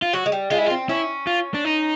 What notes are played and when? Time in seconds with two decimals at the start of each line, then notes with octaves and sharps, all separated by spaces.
0.02 F4
0.13 F#3 F#4
0.26 G#3
0.32 G3
0.51 G#3 F4
0.58 E4
0.66 F4
0.70 C4
0.89 C#4 E4
1.27 F4
1.54 D4
1.65 D#4